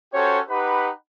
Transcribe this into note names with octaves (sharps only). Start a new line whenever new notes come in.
C#4 F#4 G4 A4 C5 C#5
D#4 G4 B4 F#5 B5